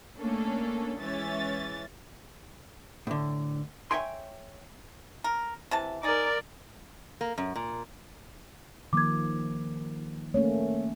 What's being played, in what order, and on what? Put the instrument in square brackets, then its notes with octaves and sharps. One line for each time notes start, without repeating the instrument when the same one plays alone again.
[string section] A3 A#3 C#4 D4 A4
E3 G#3 C#4 E5 A6
[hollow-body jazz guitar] A2 D3
C#5 D#5 E5 G5 G#5 C6
[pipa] A#4
C3 E3 A5
[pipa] D#4 G#4 [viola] A#4 D5
[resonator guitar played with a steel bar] A#3
F#2
A#2
[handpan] D#3 F3 A#3 [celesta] D6 G#6
[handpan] A3 A#3 C#4 [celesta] C#5